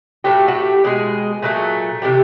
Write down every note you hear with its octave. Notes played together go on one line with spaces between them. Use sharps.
A2 F#3 A3 G4
F#4
G4
B2 G#3 G#4
A#2 F#3 A3
C3 E3 A3 G4